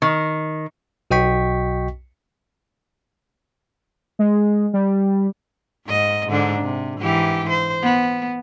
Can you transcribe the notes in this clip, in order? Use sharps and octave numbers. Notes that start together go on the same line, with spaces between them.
D#3
B1 F#4 D#5 G5 C#6 B6
G#3
G3
G#2 D#5
G#2 D3 D4
C3
G#2 E3 G4
C5
B3